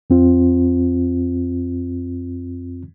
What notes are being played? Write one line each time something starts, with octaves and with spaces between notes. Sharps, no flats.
F2 C4 F4